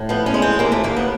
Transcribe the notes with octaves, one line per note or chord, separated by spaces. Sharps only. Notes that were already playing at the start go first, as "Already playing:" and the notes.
Already playing: A2
F3 B3
C#4
G#3
C4
D#2 A#3
A3
D#2 A#3
B3